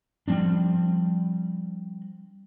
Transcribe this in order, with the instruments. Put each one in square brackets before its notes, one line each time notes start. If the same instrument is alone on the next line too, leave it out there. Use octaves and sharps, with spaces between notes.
[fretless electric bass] F3 G3 C4 D4